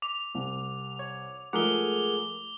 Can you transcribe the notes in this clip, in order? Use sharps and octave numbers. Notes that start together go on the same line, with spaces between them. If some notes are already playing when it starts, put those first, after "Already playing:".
D6 F7
C2
C#5
F3 G#3 A3 G#4 A#4 F#5 D6 G7